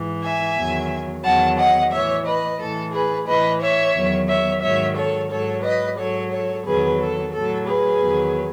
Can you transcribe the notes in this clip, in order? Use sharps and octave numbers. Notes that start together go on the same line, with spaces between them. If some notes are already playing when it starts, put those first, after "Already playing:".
Already playing: G#2 E3
E5 G#5
E2 D#3 F#3
E2 D#3 F#3 F#5 A5
D#5 F#5
A2 E3 C#5 E5
B4 D#5
A2 E3 A4
G#4 B4
A2 E3 B4 D#5
C#5 E5
E2 D#3 F#3
C#5 E5
G#2 D#3 F#3 C#5 E5
A4 C#5
G#2 F#3 A4 C#5
B4 D#5
G#2 F#3 A4 C#5
A4 C#5
E2 D#3 F#3 G#4 B4
A4
A2 F#3 A4
G#4 B4
E2 D#3 F#3